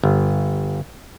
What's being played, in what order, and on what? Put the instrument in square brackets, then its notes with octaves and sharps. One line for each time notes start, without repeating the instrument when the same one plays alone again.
[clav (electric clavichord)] G1